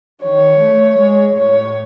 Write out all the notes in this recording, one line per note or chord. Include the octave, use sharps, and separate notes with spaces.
D#3 C#5
A3
G#3
A2 C#5